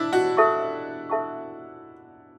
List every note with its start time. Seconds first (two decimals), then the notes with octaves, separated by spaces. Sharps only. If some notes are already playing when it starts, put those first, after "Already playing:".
Already playing: D4 E4
0.13 F#4
0.37 A4 E5 A5 C#6
1.10 A4 E5 A5 C#6